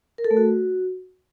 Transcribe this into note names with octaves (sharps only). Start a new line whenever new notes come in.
A#4
A4
A3
F#4